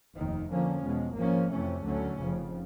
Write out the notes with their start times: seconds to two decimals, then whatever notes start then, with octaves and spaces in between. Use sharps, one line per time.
0.16 F1 D#2 D#3
0.51 F2 D3 F3 A#3 C#4
0.84 E2 B2 G#3
1.18 G#1 G#2 F3 A#3 C#4
1.52 F2 C3 E3 A3 C#4
1.86 D2 D3 F#3 A3 C#4
2.20 F1 F2 C#3 F3